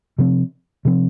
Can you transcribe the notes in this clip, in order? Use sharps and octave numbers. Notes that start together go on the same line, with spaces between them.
C3 F3 C4
C3 F3 C4